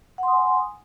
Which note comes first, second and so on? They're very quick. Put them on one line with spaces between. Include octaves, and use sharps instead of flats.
F#5 C6 D#6 G#5